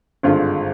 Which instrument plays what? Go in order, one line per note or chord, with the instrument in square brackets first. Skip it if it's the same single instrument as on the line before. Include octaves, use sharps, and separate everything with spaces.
[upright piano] G#1 G2 D3 G#3 F4